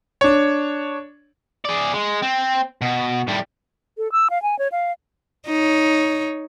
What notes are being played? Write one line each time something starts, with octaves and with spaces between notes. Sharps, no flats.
D4 C#5
G#4 D5
G#3
C4
B2
A2 G3
A4
E6
F5
G#5
C#5
F5
D#4 C#5